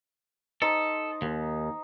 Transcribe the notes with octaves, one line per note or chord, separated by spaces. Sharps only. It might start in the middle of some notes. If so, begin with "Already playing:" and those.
D#4 A4 C5
D#2